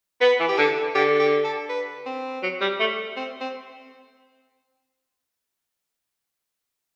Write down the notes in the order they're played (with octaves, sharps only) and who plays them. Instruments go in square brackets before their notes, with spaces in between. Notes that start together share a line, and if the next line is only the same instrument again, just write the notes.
[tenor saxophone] B3 [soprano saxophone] B4
[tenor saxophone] E3
[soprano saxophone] G4
[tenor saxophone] D3 [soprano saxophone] A4
[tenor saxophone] D3 [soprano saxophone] G4
[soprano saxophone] G4
A4
B4
C4
[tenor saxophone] F#3
G3
A3
[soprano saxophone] C4
C4